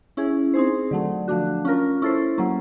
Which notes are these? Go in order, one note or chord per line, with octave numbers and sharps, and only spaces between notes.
C#4 E4 G#4
C4 D#4 G#4 C5
D3 F#3 A3
F3 A3 D4 F#4
C#4 F4 A#4
C#4 E4 A4 C5
F#3 A#3 C#4